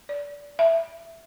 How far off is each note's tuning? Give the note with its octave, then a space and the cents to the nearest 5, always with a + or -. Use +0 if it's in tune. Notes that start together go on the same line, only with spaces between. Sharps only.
D5 -25
E5 +5